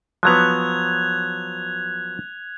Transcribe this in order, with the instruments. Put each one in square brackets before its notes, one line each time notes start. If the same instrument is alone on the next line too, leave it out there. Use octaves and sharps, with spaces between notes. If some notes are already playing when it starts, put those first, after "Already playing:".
[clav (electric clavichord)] F3 F#3 B3 [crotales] F#6 G#6 F7